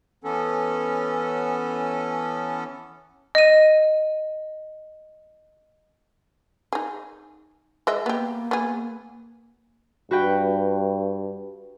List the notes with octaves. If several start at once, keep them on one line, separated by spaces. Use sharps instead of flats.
E3 B3 C#4 A4
D#5 D#7
D#4 G#4
G#3 D#5 E5
A#3 B3 G4
B3 G#4
G2 F#4 B4 G5